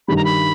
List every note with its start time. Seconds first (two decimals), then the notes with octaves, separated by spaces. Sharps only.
0.08 G2 D#3 G3 B5
0.16 A#5
0.25 B5